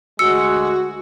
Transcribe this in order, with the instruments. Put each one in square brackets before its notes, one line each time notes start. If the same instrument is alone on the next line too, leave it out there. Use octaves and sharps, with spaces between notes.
[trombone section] D2 G#3 [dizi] F#4 [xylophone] E6 C#7